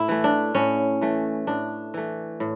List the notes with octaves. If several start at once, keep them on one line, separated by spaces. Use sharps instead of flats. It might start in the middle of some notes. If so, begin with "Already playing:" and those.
Already playing: A2 E4
E3 A3
D4
A2 C#4
E3 A3
A2 D4
E3 A3
A2